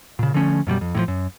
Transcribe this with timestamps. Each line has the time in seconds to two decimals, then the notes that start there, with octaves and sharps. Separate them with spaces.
0.19 A#2 C#3
0.34 D3 F3 A3 C#4
0.67 F#2 B2 F#3 G3
0.81 F2
0.95 A2 D3 F3
1.08 F#2